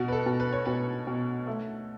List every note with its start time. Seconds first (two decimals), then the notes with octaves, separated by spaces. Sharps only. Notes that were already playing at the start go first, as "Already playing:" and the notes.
Already playing: B2 F#4
0.08 B4
0.12 A4
0.26 B2
0.40 B4
0.52 C#5
0.66 B2 B4
1.07 B2
1.47 A3